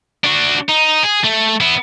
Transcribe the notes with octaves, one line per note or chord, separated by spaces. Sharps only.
D4 F#4
D#4
G#4
A3
B3 E4